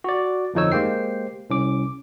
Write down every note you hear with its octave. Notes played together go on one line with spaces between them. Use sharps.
F#4 D5
G1 F2 F3 D#4 C#5 E6
G#3 A#3 G4 C5 G5 C7
C2 C#4 D6